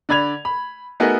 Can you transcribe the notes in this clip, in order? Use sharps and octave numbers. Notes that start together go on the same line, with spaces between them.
D3 D5 B5 G#6 F7
B5
A3 B3 D#4 F#4 G#4 A#4